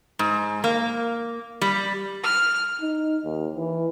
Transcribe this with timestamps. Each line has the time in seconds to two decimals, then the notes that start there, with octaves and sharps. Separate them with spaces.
0.19 G#2
0.64 A#3
1.61 G3
2.23 F6
2.81 D#4
3.25 D#2
3.56 E3